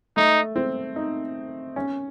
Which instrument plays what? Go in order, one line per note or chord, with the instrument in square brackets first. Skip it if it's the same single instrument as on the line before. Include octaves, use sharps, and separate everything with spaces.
[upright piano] A3 [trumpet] D#4
[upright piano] C4
D#4
C#4